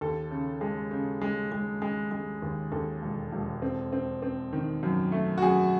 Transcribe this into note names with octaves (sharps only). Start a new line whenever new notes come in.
D#2 A4
C#3
G#3
C#3
G#3
G#3
G#3
G#3
D#2
D#2 A4
E1
E1
C4
C4
C4
D#3
F#2
A3
F#4
F#2 G#4